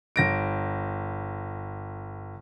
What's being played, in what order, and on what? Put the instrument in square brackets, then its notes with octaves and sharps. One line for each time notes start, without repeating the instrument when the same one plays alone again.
[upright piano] G1 A#6 D7